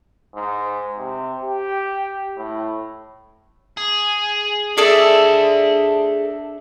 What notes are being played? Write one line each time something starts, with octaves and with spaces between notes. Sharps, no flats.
G#2
C3
G4
A2
G#4
D4 G#4 A4 D5 E5